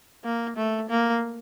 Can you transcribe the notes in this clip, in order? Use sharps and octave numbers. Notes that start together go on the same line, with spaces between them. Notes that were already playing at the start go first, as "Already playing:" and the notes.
A#3
A3
A#3